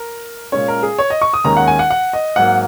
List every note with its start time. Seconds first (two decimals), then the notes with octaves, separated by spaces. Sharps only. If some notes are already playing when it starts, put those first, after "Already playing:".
Already playing: A#4
0.52 A#2 G#3 C#4 C#5
0.68 A#4
0.83 G#4
0.99 C#5
1.10 D#5
1.22 C#6
1.33 D#6
1.44 D#2 D#3 G#3 C#4 A#5
1.57 F#5
1.68 G#5
1.79 F#5
1.90 F#5
2.13 D#5
2.36 G#2 F#3 A#3 F#5